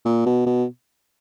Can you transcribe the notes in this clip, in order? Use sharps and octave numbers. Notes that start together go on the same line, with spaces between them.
A#2
B2
B2